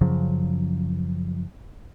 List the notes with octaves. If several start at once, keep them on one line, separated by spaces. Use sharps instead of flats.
F#2 C#3 F3 F#3